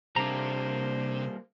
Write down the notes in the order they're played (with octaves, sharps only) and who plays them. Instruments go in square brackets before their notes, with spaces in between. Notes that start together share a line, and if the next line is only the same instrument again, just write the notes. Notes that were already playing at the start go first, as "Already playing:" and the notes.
[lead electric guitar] C3 [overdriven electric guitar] G3 A#3 [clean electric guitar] D4 A#5 [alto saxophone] C5